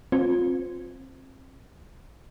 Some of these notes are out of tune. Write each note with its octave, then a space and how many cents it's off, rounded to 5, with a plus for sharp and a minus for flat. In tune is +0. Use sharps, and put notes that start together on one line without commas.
C4 +30 F4 +20 C5 -35